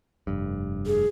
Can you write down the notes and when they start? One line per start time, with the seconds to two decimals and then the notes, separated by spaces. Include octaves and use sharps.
0.27 F1 G2
0.86 G#4